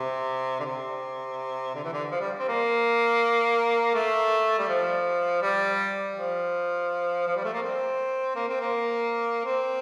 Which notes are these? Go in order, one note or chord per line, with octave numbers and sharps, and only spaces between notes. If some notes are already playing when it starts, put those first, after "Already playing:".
Already playing: C3
D3
C3
D3
E3
D3
F3
G3
C4
A#3
A3
G3
F3
G3
F3
F3
G3
A3
A#3
C4
A#3
C4
A#3
C4